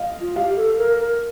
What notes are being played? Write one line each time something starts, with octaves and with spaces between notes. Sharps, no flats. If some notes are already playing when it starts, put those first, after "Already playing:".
Already playing: D#5 F5
F4
G4 F5
A4
A#4
A#4